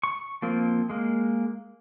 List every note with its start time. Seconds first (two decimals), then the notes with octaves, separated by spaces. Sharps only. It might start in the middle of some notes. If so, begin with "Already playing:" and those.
0.03 C#6
0.42 F3 A#3 C4
0.90 G#3 A#3